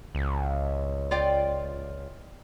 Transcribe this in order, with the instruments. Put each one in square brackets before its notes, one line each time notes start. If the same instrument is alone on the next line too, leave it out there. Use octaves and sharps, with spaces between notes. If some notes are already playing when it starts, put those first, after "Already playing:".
[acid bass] C#2
[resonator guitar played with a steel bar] F4 D5 G5